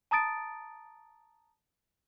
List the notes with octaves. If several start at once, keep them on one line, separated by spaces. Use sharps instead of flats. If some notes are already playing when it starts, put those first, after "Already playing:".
A5 A#5 D#6 A6 D7